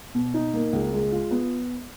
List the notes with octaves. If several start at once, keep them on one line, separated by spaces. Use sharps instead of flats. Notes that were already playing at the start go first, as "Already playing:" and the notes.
B2
D#4
A#3
C#2
G#3
F4
B3